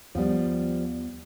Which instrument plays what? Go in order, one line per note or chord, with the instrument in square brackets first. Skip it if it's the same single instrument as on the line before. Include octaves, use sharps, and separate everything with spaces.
[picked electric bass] D#2 B3 [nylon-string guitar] F3 G3